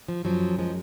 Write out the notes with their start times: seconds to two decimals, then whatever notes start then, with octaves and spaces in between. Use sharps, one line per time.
0.08 F3
0.24 F#2 F3 F#3
0.59 F3 G#3